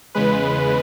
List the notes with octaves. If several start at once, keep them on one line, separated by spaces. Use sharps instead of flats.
E2 C#3 G#3 B4